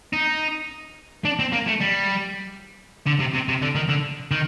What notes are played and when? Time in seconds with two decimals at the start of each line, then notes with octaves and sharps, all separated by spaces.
0.13 D#4
1.25 D4
1.39 C4
1.53 A#3
1.67 A3
1.80 G3
3.06 D3
3.19 C3
3.34 C3
3.48 C3
3.62 D3
3.75 D#3
3.89 D3
4.31 D#3